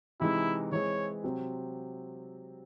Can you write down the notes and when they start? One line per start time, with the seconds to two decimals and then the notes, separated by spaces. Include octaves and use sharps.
0.20 C3 E3 G#3 D#4 E4
0.72 E3 G#3 C4 E4 G#4 C#5
1.24 C3 F#3 C4